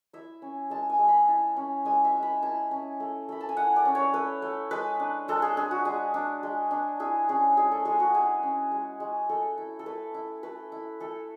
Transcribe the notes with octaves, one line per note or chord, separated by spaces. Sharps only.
E4 E5
C#4
G#3 A5
G#5
G#3
B5
E4 A5
C#4
G#3 G#5
E5
G#3
B5
E4 A5
C#4
A3
A3 B5
A5
G#5
E4 F#5
D5
C#4
C#5
A3 B4
A3
G#3 B4
D4
G#3 A4
G#4
D4 G#4
F#4
G#3 G#4
D4
G#3
D4
E4 G#4
C#4 G#4
G#3 G#4
A4
G#3 G#4
F#4
E4 G#4
C#4
G#3
G#3
A3 A4
E4
A4
A3 B4
E4
A3 B4
E4
A3 A4